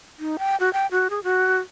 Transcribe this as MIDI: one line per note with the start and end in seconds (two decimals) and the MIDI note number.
0.20 0.37 63
0.39 0.56 79
0.60 0.72 66
0.73 0.87 79
0.91 1.08 66
1.10 1.23 68
1.24 1.59 66